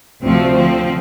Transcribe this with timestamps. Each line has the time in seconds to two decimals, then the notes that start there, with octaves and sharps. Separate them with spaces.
0.24 D2 C3 F3 C4
0.56 D3 F3 C4